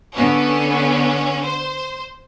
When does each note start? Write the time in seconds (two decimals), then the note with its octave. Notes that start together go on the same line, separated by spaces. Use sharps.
0.13 D3 B3 C#4
1.44 C5